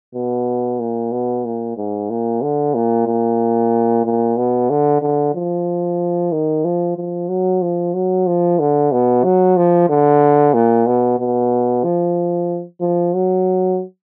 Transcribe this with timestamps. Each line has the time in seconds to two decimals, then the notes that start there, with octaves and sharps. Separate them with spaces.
0.15 B2
0.80 A#2
1.12 B2
1.45 A#2
1.77 G#2
2.10 A#2
2.42 D3
2.75 A#2
3.07 A#2
4.05 A#2
4.37 B2
4.70 D3
5.02 D3
5.35 F3
6.32 D#3
6.64 F3
6.96 F3
7.29 F#3
7.62 F3
7.94 F#3
8.27 F3
8.59 D3
8.92 B2
9.24 F#3
9.57 F3
9.89 D3
10.54 A#2
10.87 B2
11.19 B2
11.84 F3
12.81 F3
13.14 F#3